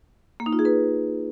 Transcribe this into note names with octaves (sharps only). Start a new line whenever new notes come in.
A#3
D#4
F4
G#4
B4